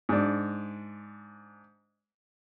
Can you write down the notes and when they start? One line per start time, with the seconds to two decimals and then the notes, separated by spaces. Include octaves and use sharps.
0.09 G#2 D4